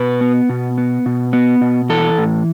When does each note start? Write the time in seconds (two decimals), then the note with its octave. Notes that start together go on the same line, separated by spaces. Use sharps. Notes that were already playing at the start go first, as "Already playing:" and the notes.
Already playing: B2 B4
0.21 B3
0.49 B2
0.78 B3
1.06 B2
1.33 B3
1.61 B2
1.90 E3 A4
2.18 A2